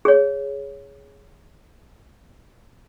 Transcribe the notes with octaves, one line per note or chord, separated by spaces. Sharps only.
G#4 C#5